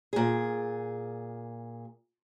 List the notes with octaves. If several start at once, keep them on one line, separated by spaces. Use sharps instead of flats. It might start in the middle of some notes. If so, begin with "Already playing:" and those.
A#2 G#4